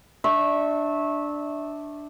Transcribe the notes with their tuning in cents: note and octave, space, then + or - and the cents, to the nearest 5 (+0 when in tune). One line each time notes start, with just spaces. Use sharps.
D4 +5 E5 -20 C#6 -20